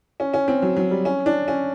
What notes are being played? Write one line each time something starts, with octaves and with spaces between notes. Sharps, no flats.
C#4
C#4
C4
F#3
F#3
G3
C#4
D4
C#4